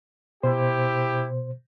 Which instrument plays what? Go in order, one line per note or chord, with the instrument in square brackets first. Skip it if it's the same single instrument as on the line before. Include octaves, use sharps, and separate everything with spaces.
[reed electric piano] B2 C5 [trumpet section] E4 G4